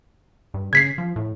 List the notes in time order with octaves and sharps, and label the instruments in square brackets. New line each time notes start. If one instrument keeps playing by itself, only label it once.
[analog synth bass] G2
[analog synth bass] C#3 [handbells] G#6 B6 C7
[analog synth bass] F3
A2